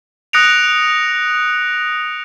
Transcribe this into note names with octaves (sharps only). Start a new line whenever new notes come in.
D#6 F#6 A#6 C#7 D7 F7